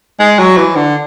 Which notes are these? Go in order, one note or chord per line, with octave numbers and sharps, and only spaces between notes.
G#3
F#3
E3
D3